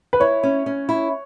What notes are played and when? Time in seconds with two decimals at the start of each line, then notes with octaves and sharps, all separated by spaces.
0.13 B4
0.20 E4 C#5
0.43 C#4
0.66 C#4
0.89 E4